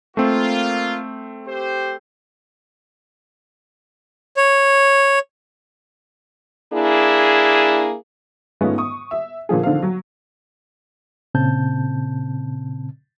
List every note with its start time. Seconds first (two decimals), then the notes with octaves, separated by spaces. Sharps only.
0.17 A3 A#3 C4 F4
1.48 G4 C5
4.37 C#5
6.73 A#3 D4 E4 G#4
8.61 G#2 G#3 A3 B3 C#4 F4
8.78 C#6 D#6
9.11 E5
9.49 A#2 D3 F3 G#4
9.63 D3 D#3 F3 C4 F5
9.82 F#3
11.35 A#2 C#3 C4 A5 G6